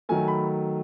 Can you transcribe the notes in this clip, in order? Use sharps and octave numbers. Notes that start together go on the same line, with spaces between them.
D#3 F#3 A3 G#5
B5